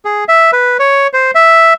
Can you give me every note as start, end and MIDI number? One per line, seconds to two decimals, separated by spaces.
0.05 0.24 68
0.29 0.51 76
0.53 0.77 71
0.79 1.07 73
1.13 1.31 72
1.35 1.73 76